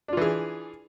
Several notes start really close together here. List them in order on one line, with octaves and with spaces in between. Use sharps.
D4 F4 E3 G#4